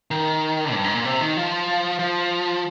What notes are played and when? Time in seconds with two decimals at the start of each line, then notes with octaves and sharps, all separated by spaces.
0.11 D#3
0.73 G2
0.84 G#2
0.95 A#2
1.05 C3
1.21 D#3
1.37 F3
1.99 F3